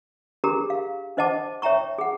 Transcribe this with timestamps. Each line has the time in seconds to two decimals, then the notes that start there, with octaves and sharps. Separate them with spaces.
0.44 D4 G4 G#4 A#4 A#5
0.70 F5
1.17 D4 C5 D#5 F#5 A5 D6
1.62 C#5 E5 G5 A#5 C#6
1.98 G#4 F#5